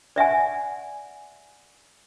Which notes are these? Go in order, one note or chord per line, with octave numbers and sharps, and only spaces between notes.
D5 E5 F#5 G#5